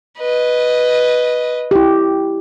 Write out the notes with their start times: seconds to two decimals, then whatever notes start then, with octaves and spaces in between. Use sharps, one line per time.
0.19 B4 D#5
1.71 E4 G4